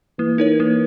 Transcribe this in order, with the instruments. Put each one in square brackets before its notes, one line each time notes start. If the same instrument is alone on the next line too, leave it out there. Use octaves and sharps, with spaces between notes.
[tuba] E3 [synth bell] A#3
[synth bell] D#4 A#4 C#5
A#3